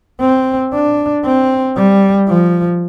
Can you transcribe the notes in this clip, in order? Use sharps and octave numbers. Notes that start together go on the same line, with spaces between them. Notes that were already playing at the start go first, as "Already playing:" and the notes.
C4
D4
C4
G3
F3